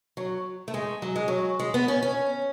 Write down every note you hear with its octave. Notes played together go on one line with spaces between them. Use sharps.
F#3
A3
G#3
F#3
G#3
F#3
G#3
B3
C#4
C#4